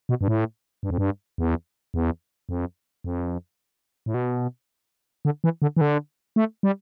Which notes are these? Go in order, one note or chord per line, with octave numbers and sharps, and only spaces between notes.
B2
G2
A2
G2
F2
G2
E2
E2
F2
F2
A2
B2
D3
E3
D3
E3
D3
A3
G3